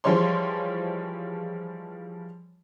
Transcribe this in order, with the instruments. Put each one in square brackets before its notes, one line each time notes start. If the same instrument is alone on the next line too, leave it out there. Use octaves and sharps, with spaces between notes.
[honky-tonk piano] E3 F3 G3 G#3 C#5 C6